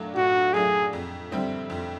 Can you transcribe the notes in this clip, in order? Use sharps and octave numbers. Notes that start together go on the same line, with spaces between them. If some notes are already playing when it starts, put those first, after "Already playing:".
Already playing: A2 F#3 A3 D4 F4
A2 F#4
F#3 A3 D4 F4 G#4
F2
D3 G3 C4 E4
F2